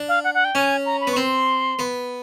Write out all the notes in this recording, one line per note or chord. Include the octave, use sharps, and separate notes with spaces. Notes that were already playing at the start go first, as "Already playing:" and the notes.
Already playing: D4
F5
F#5
F#5
G5
C#4 G#5
A#5
B5
B3 C#6
C4 C6
B3